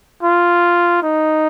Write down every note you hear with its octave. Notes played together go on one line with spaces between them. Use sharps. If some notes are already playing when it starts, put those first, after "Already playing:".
F4
D#4